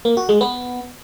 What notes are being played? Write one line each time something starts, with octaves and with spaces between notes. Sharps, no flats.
A#3
F#4
G#3
B3